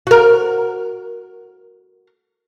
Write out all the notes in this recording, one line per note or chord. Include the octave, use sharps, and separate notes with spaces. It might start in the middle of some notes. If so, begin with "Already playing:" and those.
F#4 A#4